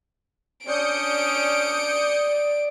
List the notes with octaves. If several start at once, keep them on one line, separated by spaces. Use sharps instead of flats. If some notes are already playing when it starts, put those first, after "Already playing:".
C#4 D4 D5 D#6 G6 C#7 D7